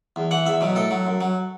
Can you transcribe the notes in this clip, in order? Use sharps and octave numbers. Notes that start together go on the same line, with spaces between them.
E2
E3 F#5
E2 E5
B2 F#3
A2 A4
F#3
F#2
F#3